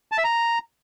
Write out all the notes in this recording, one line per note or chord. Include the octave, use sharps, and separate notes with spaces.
A5
E5
A#5